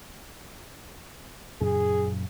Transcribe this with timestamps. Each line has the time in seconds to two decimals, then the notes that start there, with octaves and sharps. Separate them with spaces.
1.61 F#2 A#2 C#3 G#4